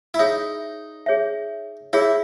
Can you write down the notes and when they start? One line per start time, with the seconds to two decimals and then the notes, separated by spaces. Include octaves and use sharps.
0.14 E4
0.19 D#4 G#4 C#5 E5
1.06 G#4 C#5 E5
1.93 E4 G#4 C#5 E5